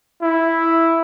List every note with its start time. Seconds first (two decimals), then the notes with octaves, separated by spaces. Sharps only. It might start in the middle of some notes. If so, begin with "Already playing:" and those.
0.22 E4